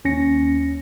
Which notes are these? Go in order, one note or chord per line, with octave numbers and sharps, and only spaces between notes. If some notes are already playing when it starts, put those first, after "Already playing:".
D#2 C#4 A#6 C#7